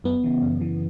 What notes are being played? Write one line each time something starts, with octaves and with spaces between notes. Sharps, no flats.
F#2 B3
C#3 E3
F#2
C#3 E3